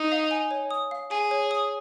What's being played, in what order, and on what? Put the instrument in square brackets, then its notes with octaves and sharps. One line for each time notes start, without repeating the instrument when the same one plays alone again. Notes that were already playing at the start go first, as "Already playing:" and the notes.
Already playing: [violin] D#4 [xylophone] D#6
[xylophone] F5
G#5
C#5
D#6
F5
[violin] G#4 [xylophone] G#5
[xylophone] C#5
D#6